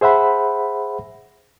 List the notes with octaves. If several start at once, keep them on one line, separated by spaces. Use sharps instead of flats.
G#4 C5 E5 F#5 B5